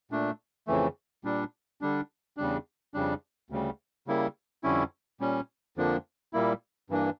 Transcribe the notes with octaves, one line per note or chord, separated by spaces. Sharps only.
A#2 A3 D4
F2 C#3 E3 A3
A#2 G3 D4
D3 G3 D4
E2 C#3 G3 D4
F2 C#3 G3 D4
D2 C#3 G3
C#3 G3 A#3 E4
F2 D3 G3 C#4 E4
A#2 G3 C#4
F2 D3 F3 A#3 D4
A#2 G3 A#3 E4
G2 E3 A#3 D4